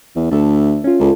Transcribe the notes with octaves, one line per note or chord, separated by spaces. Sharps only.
E2
D2 A4 E5 A5
C#4 F4
C#2 F4 A4